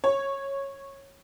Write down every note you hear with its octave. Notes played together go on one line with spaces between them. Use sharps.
C#5